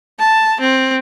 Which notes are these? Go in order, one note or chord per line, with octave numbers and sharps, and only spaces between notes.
A5
C4